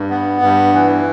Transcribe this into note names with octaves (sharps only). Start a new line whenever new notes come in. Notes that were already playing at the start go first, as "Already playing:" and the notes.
Already playing: G2
B3
G2
E3